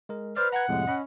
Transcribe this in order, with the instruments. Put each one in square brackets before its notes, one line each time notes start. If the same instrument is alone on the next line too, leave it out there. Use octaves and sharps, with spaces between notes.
[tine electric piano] G#3 A#4
[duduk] B4 [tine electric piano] C5 D5 [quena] F6
[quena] F#5 [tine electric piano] A#5 G#6
[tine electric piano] F2 A2 C3 [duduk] G#3
[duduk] C#4 [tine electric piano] D#5 B5